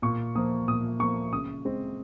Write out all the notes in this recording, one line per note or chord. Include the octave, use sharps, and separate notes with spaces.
A#2 C#6
F3 A#3 D#6
A#2 D#6
F3 A#3 C#6
C#3 D#6
G#3 C4